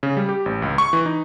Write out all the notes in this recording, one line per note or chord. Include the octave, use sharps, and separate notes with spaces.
C#3
G3
G4
A1
C#2
C#6
E3
D#4